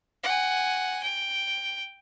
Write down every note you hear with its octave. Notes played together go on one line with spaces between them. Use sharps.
F#5 G#5
G5